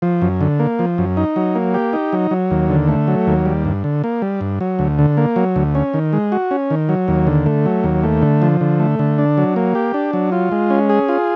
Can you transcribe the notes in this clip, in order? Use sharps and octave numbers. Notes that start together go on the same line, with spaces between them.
F3
F#2
D3
A#3
F3
F#2
D#4
F#3
A#3
G4
D#4
F#3
F#3
D#2
D3
A3
F#3
D#2
G3
G2
D3
A#3
G3
G2
F#3
D2
D3
A#3
F#3
D2
C#4
D#3
G#3
F#4
C#4
D#3
F#3
D#2
D3
A3
F#3
D#2
A3
D3
F3
D3
A3
D3
D4
F#3
A#3
G4
D4
F#3
F4
G#3
C#4
G#4
F4